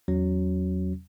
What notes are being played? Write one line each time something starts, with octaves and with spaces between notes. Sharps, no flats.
E2 F#3 C#4